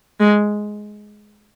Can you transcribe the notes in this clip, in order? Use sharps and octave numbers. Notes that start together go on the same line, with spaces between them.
G#3